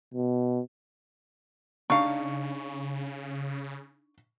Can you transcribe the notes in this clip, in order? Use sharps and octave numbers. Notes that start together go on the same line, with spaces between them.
B2
C#3 D4 D#4 F5 C#6